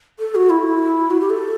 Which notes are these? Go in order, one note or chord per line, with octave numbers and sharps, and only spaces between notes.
A4
F#4
E4
F#4
G4
A4